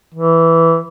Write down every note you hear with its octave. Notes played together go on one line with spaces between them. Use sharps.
E3